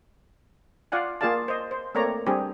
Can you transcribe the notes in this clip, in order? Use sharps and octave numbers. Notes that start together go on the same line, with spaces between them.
F4 D5 F5 F#5 G#5
A#3 F4 G#4 D5 F5 A5
C5 D#5
C5
A3 A#3 C4 C#5 D5 A#5
G3 C4 D4 G4 G#4